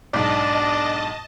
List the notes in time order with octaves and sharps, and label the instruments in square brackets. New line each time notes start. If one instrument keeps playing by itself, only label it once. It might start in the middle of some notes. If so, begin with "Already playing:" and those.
[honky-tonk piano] B1 G#2 [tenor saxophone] D4 [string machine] D#5 A5